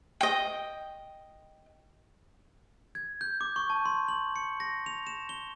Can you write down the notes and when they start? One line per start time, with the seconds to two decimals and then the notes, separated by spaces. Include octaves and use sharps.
0.21 D#5 G5
2.95 G#6
3.21 G6
3.41 D6
3.56 C#6
3.70 A5
3.86 C6
4.08 F#7
4.36 C#7
4.60 A#6
4.86 F7
5.07 E7
5.29 G7